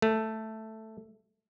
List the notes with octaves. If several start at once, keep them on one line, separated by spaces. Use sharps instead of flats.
A3